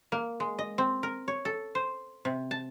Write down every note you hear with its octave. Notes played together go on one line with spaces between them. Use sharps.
A#3
G#3
D#5
C4
A#4
C#5
A4
C5
C3
A5